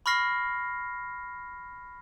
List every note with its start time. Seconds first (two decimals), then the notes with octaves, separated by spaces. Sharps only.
0.06 B5 C#6 F6 A#6 C7